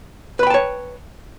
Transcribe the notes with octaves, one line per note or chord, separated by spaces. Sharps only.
B4 C#5 G5 A5 B5